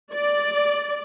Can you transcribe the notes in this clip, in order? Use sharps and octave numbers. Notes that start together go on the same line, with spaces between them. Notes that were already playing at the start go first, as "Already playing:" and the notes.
D5